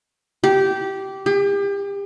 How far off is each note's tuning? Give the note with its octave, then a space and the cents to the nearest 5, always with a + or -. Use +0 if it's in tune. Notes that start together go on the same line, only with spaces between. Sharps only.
G4 -15
G4 +35